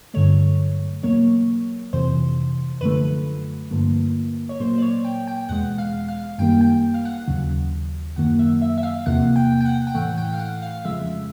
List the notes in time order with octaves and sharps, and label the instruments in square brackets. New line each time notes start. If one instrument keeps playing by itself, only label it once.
[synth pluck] G2 D3 F#3 A3 C#5
E2 B2 F#3 A#3 C#5
F2 C3 E3 C5
F#2 D3 F3 A3 B4
G2 D3 F3 A#3
C#5
A#2 F#3 A#3 C5
D5
C#5
G5
G5
E2 B2 G#3 F#5
F5
F5
F#2 D#3 G3 A#3 G5
G5
F5
F#5
D#2 C#3 F#3
F#2 D#3 F#3 A#3 F#5
E5
E5
E5
F5
E2 C3 F3 A#3 F#5
G5
G5
F#5
G5
A2 E3 A3 F#5
G5
F5
F#5
F5
F2 C#3 F3 G#3 E5